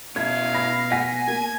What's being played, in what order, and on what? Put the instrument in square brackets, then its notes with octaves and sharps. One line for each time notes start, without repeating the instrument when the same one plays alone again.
[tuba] B2 [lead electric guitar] C#4 E4 [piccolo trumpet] F5 [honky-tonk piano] G#6
[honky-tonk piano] B5 D#6 A#6
[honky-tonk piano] F#5 A#6 B6 [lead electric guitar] G#5
[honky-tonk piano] A#3 [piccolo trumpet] G#6